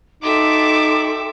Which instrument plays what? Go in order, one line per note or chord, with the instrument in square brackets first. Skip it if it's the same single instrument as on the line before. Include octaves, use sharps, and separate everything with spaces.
[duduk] D#4 [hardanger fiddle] F#4 E5 [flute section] A4 G5 C6 [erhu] D6